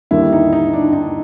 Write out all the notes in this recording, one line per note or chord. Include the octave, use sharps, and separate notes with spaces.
D#2 D3 G3 A#3 E4
D#4
D#4
D4
D#4